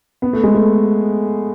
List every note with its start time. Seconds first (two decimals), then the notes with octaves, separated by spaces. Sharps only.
0.22 B3
0.33 A3
0.43 G#3
0.55 A3